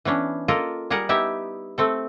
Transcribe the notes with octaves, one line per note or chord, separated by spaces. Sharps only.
E3 B3 C#4 D4
A#3 F4 A4 A#4 D#5
G3 G#4 A#4 F#5
B3 D#4 E4 G4 E5
A3 C4 A4